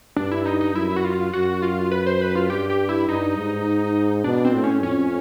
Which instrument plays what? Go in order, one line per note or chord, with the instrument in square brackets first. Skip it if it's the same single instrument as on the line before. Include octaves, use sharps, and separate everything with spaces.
[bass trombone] G2 [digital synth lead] D4
[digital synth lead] E4
D#4
D#4
[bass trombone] F#2 [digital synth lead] E4
[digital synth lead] F#4
F4
[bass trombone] F#2 [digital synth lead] F#4
[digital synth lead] F4
B4
C5
B4
F4
[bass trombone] G2 [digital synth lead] G4
[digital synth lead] G4
E4
[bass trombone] G2 [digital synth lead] D#4
[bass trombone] G#2
[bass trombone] B2 [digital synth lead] D4
[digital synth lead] C4
[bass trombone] A2
[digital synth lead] C#4
[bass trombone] F2 [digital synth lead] C#4